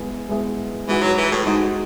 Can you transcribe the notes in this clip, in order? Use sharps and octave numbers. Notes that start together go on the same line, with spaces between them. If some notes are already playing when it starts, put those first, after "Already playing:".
Already playing: G#3 B3 E4 G#4
G#3 B3 E4 G#4
E3 G#3 D#4 F#4
F#3
E3
A2
G#2 G#3 D#4 F#4